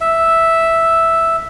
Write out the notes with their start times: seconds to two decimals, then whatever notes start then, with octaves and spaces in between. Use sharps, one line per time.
0.01 E5